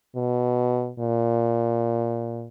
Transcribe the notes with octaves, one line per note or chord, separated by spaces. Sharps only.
B2
A#2